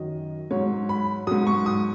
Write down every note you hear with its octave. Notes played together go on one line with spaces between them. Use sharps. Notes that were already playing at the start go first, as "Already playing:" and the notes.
Already playing: F#2 D#3 F#3 D#5
G#2 F#3 C#5
B5
G#2 F#3 D#6
C#6
D#6